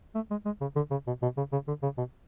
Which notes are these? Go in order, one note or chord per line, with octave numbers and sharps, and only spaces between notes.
A3
G#3
G#3
C#3
D3
C#3
B2
B2
C#3
C#3
D3
C#3
B2